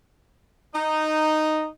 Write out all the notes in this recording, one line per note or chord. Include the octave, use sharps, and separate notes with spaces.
D#4